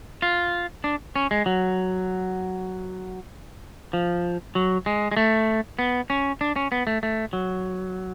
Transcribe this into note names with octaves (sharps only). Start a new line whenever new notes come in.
F4
D4
C#4
G#3
F#3
F3
F#3
G#3
G#3
A3
B3
C#4
D4
C#4
B3
A3
A3
F#3